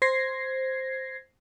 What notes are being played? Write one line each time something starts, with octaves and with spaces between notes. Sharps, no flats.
C5 G#6 A#6 C7